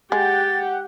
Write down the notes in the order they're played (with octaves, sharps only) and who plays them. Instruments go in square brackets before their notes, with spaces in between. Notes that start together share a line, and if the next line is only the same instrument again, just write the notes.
[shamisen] G#3 [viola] G4 G5 [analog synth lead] F#5 [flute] A6